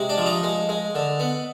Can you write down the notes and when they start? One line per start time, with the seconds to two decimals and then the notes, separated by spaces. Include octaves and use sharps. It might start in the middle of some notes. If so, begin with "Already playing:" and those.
Already playing: C3 G#3
0.09 D4
0.18 F3
0.26 D#4
0.43 G#3
0.69 G#3
0.95 D3
1.20 B3